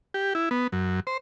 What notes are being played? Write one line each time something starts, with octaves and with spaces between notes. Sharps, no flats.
G4
E4
B3
F#2
C5